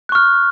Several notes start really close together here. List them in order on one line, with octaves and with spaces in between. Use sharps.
F#6 C#6 F6